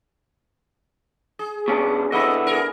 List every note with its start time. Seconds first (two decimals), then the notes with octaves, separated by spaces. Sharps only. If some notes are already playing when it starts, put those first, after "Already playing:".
1.39 G#4
1.68 B2 C#4 D4
2.12 D3 B3 C4 E4 D#5
2.47 G#4 A#4